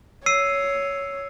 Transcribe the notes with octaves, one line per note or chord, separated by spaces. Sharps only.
C#5 E6 C7 D#7